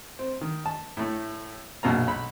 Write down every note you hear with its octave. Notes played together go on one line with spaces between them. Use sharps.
C4
D#3
A5
A2 A3
A#1 F#2 B2 A#3 A#5
B1 B5